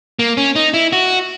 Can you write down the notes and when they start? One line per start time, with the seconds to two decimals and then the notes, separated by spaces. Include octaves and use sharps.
0.19 A#3
0.37 C#4
0.56 D#4
0.74 E4
0.93 F#4